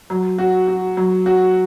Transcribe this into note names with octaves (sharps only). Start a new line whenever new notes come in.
F#3
F#4
F#4
F#3
F#4